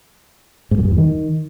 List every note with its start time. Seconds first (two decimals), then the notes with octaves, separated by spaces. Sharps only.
0.71 G#2
0.78 F#2
0.85 G2
0.91 E2
0.98 D#3